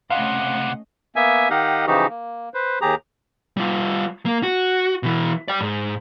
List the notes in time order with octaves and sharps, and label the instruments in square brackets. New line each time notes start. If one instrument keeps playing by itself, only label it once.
[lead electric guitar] C#2 C3 [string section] A3 C#4 D#5 [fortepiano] F5 [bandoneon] F#5
[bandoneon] A#3 B3 E5 G#5
D#3 D#4 G4 D#5 F5 F#5
C#3 E3 F3 D#4 F#4 G4
A#3
B4 C5
D#2 G4 G#4 A#5
[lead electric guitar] G3 F4
A#3
F#4
B2 E3
D5 G5
G#2